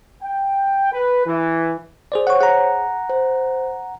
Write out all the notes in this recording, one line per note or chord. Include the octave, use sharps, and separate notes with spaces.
G5
B4
E3
G#4 C5 D5
C5 C#5 F#5 C#6 F#6
G#4 F#5 A#5
C5